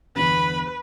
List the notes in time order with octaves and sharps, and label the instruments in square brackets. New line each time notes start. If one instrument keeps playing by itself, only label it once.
[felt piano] G1 E2 [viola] B4 [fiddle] B5